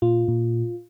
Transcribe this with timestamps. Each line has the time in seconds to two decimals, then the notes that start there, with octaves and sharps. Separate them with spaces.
0.02 A#2 F4
0.28 A#2